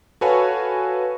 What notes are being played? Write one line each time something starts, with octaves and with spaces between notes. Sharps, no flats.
F#4 A4 B4 C#5 F5 G#5